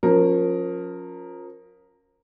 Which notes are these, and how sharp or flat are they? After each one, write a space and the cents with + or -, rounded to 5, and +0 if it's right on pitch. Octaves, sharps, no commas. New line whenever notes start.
F3 +35 C#4 +0 A#4 +0